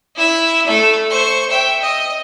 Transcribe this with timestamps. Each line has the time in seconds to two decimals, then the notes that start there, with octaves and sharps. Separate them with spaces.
0.16 E4 E5
0.67 A3 A4
1.10 C5 C#6
1.50 E5 G5
1.81 D#5